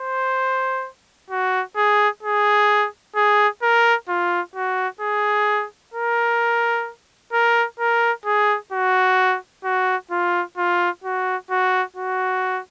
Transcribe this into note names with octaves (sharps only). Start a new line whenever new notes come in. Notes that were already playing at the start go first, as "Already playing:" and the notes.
Already playing: C5
F#4
G#4
G#4
G#4
A#4
F4
F#4
G#4
A#4
A#4
A#4
G#4
F#4
F#4
F4
F4
F#4
F#4
F#4